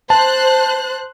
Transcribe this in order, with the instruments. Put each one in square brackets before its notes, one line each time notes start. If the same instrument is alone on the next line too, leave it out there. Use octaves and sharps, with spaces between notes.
[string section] C5 F#6 [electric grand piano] A5